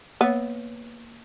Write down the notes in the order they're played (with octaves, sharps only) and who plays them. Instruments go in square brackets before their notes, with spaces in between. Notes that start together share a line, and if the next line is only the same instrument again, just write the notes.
[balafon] A#3 C#5 [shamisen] B3